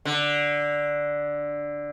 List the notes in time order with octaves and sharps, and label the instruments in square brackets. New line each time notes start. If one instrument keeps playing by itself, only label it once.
[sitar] D3